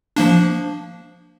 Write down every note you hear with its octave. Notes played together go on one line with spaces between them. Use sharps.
F3 A#3 D4